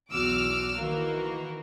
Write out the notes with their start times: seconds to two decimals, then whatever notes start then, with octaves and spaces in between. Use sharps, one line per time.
0.10 B1 E2 F#4 D6 E6 F6
0.76 D#3 E3 A#3 F#4